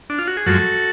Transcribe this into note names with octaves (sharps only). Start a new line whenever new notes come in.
D4
F4
F#4
G#4
F#2 F3 G#3 F#4 A4